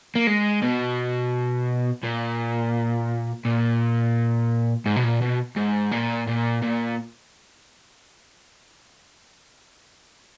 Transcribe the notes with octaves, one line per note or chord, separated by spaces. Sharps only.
A#3
G#3
B2
A#2
A#2
G#2
B2
A#2
B2
G#2
A#2
A#2
A#2